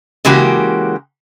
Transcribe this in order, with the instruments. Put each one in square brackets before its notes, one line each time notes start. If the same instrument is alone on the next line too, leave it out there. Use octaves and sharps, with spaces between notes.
[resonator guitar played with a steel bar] C#3 E3 G#3 A#3 F#4 G4